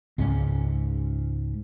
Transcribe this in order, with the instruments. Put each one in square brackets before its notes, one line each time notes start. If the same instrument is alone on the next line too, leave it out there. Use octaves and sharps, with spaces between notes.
[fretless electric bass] C#2 G#2 C#4